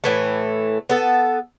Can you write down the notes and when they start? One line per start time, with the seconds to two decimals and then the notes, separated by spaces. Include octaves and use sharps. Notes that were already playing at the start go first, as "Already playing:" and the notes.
0.04 A2 E3 A3
0.89 B3 A4